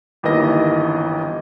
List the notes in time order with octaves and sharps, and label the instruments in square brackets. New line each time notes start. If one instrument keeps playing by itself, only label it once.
[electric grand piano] G1 D#2 E3 A#4 D#5 A#6